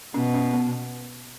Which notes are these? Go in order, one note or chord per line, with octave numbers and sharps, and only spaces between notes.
B2 C#4
C#4
B3